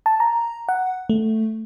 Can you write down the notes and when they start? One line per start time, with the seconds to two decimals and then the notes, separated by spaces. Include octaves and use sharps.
0.06 A5
0.20 A#5
0.69 F#5
1.09 A3